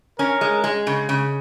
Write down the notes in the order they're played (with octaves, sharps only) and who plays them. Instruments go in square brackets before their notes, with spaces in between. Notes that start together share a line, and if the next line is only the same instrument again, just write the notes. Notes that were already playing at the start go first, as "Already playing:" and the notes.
[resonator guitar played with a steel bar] C#4 [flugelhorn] A#4
[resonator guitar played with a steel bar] G#3
G#3
C#3
C#3